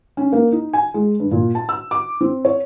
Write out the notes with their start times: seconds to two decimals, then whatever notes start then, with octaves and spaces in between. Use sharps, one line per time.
0.17 C#4
0.32 A#3
0.52 D#4
0.73 G#5
0.94 G#3
1.20 G2
1.31 A#2
1.55 A5
1.69 E6
1.91 D6
2.21 C4
2.45 C#5